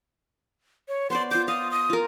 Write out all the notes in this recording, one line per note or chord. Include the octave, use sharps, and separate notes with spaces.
C#5
B3 C5 D5 C6
F4 D6 G6
F5 D#6
D#6
F4 A#4